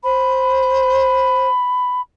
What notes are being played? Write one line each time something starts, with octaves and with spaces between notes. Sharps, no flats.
C5 B5